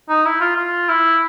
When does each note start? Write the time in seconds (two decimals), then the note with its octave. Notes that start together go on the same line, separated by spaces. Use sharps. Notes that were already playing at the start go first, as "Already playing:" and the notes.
0.09 D#4
0.25 E4
0.40 F4
0.57 F4
0.89 E4